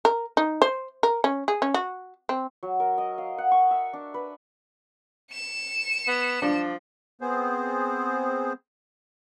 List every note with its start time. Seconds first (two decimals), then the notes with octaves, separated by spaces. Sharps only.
0.05 A#4
0.37 D#4
0.62 C5
1.03 A#4
1.24 C#4
1.48 G#4
1.62 C#4
1.74 F#4
2.29 C4
2.63 F#3
2.80 A#4
2.98 D#5
3.18 F5
3.38 F#5
3.51 C#6
3.71 E5
3.93 D4
4.14 B4
5.32 C#7 E7
6.08 B3
6.42 F3 D4
7.21 B3 C4 G#4 C5